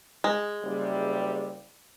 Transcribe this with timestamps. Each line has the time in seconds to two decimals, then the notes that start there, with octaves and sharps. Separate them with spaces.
0.24 G#3
0.63 F#1 C3 G3